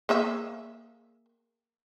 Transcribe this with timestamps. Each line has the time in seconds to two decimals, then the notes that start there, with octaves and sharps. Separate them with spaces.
0.09 A#3 G#4 E5